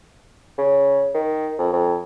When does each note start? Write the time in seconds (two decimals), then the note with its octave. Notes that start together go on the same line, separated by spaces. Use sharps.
0.58 C#3
1.14 D#3
1.59 F2
1.73 F2